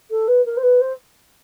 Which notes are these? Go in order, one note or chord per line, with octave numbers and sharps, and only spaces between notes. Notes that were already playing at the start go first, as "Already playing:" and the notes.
A4
B4
A#4
C5
B4
C5